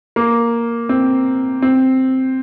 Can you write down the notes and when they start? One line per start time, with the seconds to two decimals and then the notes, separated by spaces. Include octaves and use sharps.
0.16 A#3
0.89 C4
1.62 C4